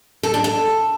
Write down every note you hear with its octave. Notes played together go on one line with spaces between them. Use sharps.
A4
D4
A4